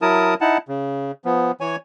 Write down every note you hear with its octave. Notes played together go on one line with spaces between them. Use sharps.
F#3 E4 A#4 A5 D#6
D#4 E4 F#5 A5
C#3
F3 B3
E3 C#5 G#5